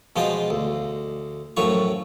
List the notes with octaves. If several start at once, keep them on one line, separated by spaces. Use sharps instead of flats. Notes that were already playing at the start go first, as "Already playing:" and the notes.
B2 F3 G#3 F4 G5
D2
F#2 A2 F3 C#5 C#6